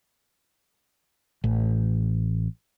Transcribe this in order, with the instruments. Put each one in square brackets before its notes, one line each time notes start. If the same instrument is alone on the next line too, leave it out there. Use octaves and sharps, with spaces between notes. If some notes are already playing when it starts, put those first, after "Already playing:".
[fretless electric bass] A1